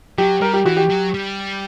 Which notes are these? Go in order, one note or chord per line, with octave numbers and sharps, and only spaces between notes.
F#3 G4
G3 A#4
G4
E3 F#4
G4
F#3
G3